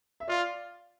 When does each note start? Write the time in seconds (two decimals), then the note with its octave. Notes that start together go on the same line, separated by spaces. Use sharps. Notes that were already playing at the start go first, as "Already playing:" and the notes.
0.20 E5
0.28 F4 D5 F5